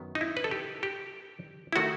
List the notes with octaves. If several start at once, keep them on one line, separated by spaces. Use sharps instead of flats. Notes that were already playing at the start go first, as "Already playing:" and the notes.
Already playing: F#2 D#3 F#3 B3
D#4
E4
B4
A4
G4
G4
E4
D#3 A3 F#4